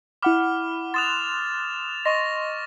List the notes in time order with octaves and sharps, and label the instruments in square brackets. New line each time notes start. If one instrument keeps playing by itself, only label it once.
[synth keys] E4 F#5 B5 [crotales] D6 F6
[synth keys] C6 D#6 F#6 [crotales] A6 E7 F7
[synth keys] D#5 C6 [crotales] C#6 A#6